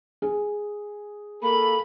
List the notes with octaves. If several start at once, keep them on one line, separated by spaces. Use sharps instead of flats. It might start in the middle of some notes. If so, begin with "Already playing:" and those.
G#4
A#3 A4 B5